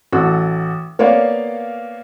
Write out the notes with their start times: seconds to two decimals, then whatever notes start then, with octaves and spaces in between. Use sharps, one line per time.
0.12 A1 F#4 A4
0.99 A#3 B3 C#5 D5 F5